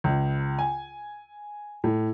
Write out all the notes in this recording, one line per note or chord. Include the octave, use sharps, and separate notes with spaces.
C#2
G#5
A2